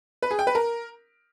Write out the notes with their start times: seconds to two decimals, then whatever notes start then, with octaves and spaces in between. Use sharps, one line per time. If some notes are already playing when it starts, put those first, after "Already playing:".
0.22 B4
0.31 G#4
0.39 G5
0.47 B4
0.55 A#4